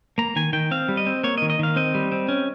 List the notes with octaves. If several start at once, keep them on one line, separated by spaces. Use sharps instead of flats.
A#3 A#5
D#3 G#5
D#3 G5
C4 F5
G3
D#5
C4
A#3 C#5
D#5
D#3
D#5
D#3 F5
C4 D#5
G3
C4
C#4